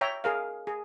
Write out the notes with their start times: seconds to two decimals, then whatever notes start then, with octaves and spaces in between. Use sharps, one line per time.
0.01 C#5 E5 G5 A#5
0.24 G#4 A#4 F5
0.67 G#4